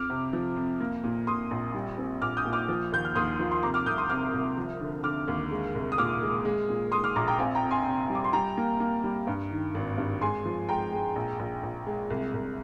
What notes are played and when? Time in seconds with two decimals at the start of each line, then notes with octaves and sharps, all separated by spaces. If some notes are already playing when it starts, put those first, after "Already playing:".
Already playing: F2 D6 F6
0.10 C3
0.33 F3
0.57 F2
0.80 A#3
1.04 A#2
1.27 A#2 C6 D#6
1.51 A#1
1.74 G3
1.98 C4
2.21 A#1 D6 F6
2.37 D#6 G6
2.45 A#2
2.53 D6 F6
2.69 F3
2.92 D#2 G6
3.05 F6
3.15 D#2 C6 D#6
3.40 F3
3.51 C6
3.63 C3 A#5 D6
3.74 D6 F6
3.86 C2 D#6 G6
3.98 C6 D#6
4.10 C3 D6 F6
4.33 C2
4.57 F3
4.81 D3
5.04 D3 D6 F6
5.28 D#2
5.51 G#3
5.75 C2
5.92 D#6
5.98 A#2 D6 F6
6.22 G#3
6.45 G#3
6.69 A#2
6.92 G#3 C6 D#6
7.04 D6 F6
7.16 A#1 A#5 D6
7.27 G5 A#5
7.39 C4 F5 G#5
7.55 G5 A#5
7.63 F2
7.71 G#5 C6
7.86 C3
8.10 G3
8.15 D6
8.24 C6
8.33 G3 G5 A#5
8.57 A#3
8.80 A#3
9.04 G3
9.27 G2
9.51 D#3
9.75 G#1
9.98 G2
10.21 G#3 G#5 C6
10.45 F3
10.69 G#3 G5 A#5
10.93 G#3
11.16 A#1
11.39 A#1
11.63 A#1
11.87 G#3
12.10 C2
12.34 C2